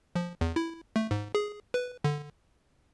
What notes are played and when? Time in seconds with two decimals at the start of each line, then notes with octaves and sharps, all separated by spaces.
0.15 F3
0.41 E2
0.56 E4
0.96 A3
1.11 G#2
1.35 G#4
1.74 B4
2.04 D3